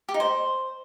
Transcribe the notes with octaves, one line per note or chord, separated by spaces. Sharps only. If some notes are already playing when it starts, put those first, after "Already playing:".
G4
D#4
C5